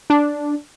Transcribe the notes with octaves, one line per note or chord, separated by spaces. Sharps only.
D4